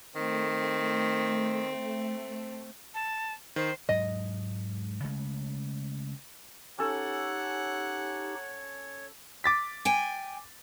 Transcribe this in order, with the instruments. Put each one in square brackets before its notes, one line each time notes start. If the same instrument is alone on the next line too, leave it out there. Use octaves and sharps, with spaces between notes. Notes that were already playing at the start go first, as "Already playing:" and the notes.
[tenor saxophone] D#3 [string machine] A3 [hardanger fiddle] C4
[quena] A5
[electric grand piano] D#3 [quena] C5
[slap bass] G#2 F#3 G#3 [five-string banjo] D#5
[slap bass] C#3 G#3 A3
[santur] C#4 A4 [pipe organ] D#4 G4 [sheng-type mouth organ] C#5 [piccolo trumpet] F#5
[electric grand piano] D6 A6 B6
[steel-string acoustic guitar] G5 G#5